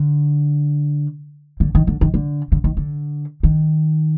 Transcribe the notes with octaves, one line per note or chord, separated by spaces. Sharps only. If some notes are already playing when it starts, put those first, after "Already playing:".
Already playing: D3
D3
D#3
D3
D#3
D3
D3
D#3
D3
D#3